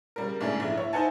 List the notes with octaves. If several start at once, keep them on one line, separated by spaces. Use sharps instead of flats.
C#3 G3 A#4
G#2 C#3 A3 D4 E4 G#4
A#1 E4
E4 C#5
D#4 E4 C5 F#5 G#5 A5